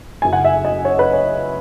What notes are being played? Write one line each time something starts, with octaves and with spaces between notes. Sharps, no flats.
F#1 F#2 C#3 G#5
F#5
E5
D#5
C#5
B4
C#5